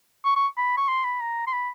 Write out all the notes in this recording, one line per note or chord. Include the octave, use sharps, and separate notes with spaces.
C#6
C#6
B5
C#6
C6
B5
A#5
C6
B5